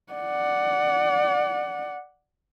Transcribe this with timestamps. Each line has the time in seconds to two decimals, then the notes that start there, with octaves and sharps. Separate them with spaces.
0.13 D5 F#5